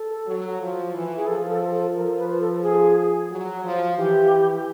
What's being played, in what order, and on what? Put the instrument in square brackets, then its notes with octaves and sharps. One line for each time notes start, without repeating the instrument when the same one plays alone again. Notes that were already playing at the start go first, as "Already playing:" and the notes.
Already playing: [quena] A4
[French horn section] F#3
F3
E3
[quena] G#4
[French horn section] F3 [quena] A4
[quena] A4
A4
[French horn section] F3 [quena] A#4
[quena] B4
A4
G#4
[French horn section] F#3
F3
[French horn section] E3 [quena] G4